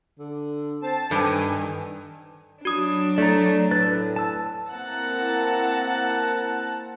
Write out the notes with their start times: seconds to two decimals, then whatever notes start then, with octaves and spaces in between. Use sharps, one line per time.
0.19 D3
0.82 C4 A5
1.11 G2 D#3 A4 G#5
2.65 F#3 D4 F#4 D#6
3.18 A3 D5 A#5
3.71 A2 A4 B4 A6
4.16 A5 E6
4.70 A#3 C4 E4 F#5 A5 A#5